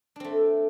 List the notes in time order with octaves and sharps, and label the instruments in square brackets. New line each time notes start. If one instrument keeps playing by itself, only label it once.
[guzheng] D4
C4
A3